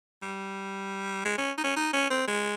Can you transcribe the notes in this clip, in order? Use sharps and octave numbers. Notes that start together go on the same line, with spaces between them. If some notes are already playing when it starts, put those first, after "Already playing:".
G3
G#3
C#4
D#4
C#4
D#4
C#4
C4
G#3